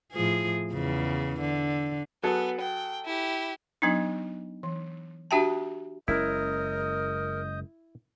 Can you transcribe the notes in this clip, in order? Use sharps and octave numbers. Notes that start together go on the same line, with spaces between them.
A2 F3 G#4
E2 C#3
D3
F#3 B3 G#4 A4
G5
E4 G4
F#3 B3 D4 D#4
E3
D4 F#4 G4 E5 G5 A5
F#1 G#3 C#4 E4 A#4 D#5 D#6 G6